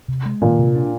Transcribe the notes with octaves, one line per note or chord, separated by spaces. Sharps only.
C3
G#3
A#2 D#3
C3
D4